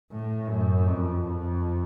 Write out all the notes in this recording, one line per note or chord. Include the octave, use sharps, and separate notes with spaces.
A2
F#2
F2
F2